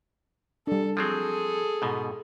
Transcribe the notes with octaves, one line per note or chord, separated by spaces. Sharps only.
G3 D4 A4
F3 F#3 C4 G#4 A4
G#2 B2